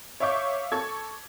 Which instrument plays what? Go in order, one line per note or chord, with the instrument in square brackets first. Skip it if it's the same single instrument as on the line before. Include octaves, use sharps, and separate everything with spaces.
[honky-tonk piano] C#5 E5 F5 C#6 D6 G6
A4 C#6 G#6